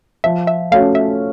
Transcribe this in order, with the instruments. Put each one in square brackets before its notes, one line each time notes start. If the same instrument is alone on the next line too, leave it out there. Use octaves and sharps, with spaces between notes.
[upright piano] F3 [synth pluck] E5
[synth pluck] E5
[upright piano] A3 C#4 F#4 [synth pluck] F5
[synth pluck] E5